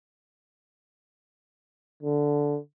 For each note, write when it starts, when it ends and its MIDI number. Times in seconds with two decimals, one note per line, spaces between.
2.02 2.58 50